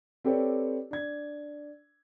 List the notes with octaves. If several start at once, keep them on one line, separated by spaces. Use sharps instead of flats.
C4 G4 A4 B4 C#5 D5
D4 G#6